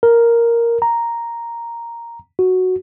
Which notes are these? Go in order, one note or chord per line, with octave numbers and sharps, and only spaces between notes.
A#4
A#5
F#4